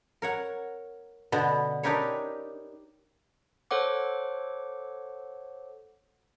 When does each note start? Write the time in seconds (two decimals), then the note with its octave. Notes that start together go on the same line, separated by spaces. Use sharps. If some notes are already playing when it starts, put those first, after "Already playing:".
0.22 A#4 C#5 F#5
1.32 B2 D3 B3
1.83 D4 D#4 G4 A#4 B4 C#5
3.71 A4 C5 C#5 F#5 D6